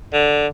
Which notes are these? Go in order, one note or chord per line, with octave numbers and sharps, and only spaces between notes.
D3